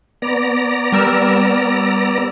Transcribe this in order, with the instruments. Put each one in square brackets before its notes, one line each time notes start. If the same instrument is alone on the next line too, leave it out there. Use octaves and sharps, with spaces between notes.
[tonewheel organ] B3 D5 A#5
[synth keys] G3 A#4 E6